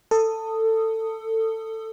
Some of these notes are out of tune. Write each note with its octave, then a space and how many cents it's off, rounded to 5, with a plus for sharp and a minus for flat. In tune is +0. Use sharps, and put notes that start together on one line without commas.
A4 +20 D#6 +0